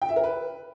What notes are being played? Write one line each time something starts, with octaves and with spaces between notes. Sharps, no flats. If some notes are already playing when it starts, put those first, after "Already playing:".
G5
E5
A#4
B4